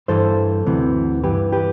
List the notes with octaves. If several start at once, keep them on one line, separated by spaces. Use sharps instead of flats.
G2 E3 A4 C5
D2 C3 E3
G2 E3 G4 B4
G4 B4